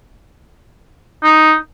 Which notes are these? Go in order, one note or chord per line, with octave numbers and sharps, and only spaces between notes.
D#4